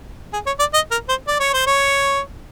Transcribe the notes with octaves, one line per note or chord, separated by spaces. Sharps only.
G#4
C#5
D5
D#5
A#4
C5
D5
C#5
C5
C#5